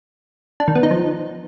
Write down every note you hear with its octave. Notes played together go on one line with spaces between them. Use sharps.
D4
D#3
B3
D#4
F3